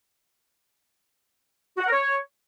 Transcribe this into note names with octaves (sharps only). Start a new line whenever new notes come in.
F#4
F#5
A#4
C#5